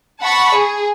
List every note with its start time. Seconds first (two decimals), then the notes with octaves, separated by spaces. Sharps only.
0.22 F#5 A5 B5 C#6
0.54 G#4